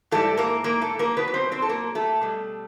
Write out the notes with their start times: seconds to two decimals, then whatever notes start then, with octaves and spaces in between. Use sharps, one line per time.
0.11 G#2 E3 G3 A3 A4
0.37 A#3 A#4
0.64 A#3 A#4
0.81 A3 A4
0.99 A#3 A#4
1.16 B2 F#3 B3 B4
1.28 B4
1.34 C4 C5
1.52 C4 C5
1.62 A4
1.69 A#3 A#4
1.95 A3 A4
2.21 B2 G3